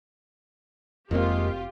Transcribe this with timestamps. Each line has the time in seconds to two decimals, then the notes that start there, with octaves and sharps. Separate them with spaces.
1.11 F1 F2 D#3 G#3 A#3 C4 F4 G4